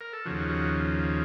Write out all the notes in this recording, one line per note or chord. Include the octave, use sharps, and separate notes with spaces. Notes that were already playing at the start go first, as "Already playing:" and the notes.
A#4
A4
D#2 C#3 F3 F#4
F#4